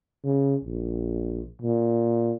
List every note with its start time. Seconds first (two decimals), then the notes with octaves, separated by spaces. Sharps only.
0.24 C#3
0.64 A#1
1.62 A#2